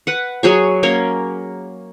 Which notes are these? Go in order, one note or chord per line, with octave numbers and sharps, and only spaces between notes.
B4 F#5
F#3 G#4 C#5
A#3 C#4 A#4 C#5